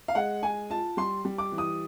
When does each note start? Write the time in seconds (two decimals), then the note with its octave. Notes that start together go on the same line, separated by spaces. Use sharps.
0.08 F5
0.15 G#3 F#5
0.43 G#3 G#5
0.70 F4 A5
0.97 G3 C6
1.25 G3
1.38 D6
1.52 E3
1.58 D#6